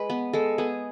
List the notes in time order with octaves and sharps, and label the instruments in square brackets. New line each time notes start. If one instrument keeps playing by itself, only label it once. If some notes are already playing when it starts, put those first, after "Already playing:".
Already playing: [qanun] G#3 B4
B3
G#3 A4
B3 G#4